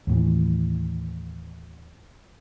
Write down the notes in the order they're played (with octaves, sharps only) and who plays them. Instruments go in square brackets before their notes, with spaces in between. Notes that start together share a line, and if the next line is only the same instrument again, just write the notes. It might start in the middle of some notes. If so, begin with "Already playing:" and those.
[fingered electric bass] D#2 A2 E3